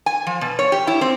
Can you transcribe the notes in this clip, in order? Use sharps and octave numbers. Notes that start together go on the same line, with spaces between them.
G#5
F3
B2
C#5
G4
E4
C4